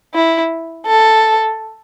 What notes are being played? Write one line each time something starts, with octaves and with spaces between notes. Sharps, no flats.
E4
A4